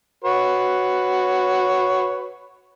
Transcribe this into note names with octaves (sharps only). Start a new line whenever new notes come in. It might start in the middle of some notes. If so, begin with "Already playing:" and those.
F#4 B4 C#5